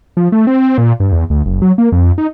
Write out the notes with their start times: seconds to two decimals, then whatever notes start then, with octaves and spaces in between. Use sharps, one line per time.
0.17 F3
0.32 A3
0.47 C4
0.78 A#2
1.00 G2
1.12 E2
1.30 D2
1.46 F#1
1.62 F#3
1.78 A#3
1.92 F2
2.18 D#4